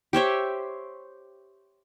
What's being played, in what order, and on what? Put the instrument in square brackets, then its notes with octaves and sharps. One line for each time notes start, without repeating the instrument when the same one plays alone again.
[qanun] G4 C5 C#5 E5